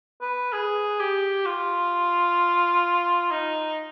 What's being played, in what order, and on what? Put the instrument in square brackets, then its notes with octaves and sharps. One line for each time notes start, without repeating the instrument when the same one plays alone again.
[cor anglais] B4
G#4
G4
F4
D#4